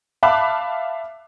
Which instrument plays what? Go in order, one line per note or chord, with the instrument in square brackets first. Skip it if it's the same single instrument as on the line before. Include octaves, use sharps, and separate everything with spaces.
[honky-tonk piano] E5 F5 A5 B5 D6 F#6